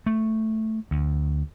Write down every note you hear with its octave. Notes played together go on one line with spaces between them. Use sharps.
A3
D2